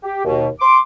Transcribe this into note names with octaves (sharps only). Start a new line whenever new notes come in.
G4
D#2 B2
C6 D6